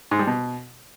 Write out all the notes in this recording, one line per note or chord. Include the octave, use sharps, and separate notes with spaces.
G#2
G3
B2